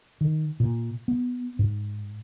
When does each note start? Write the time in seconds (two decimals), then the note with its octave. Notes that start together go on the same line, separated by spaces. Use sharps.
0.21 D#3
0.60 A#2
1.08 B3
1.59 G#2